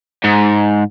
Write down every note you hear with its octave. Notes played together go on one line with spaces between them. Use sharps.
G#2